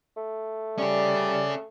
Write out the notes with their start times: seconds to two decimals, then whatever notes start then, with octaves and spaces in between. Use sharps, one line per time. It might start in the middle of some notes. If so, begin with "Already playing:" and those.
0.17 A3
0.78 G3 C#4 G#4 D5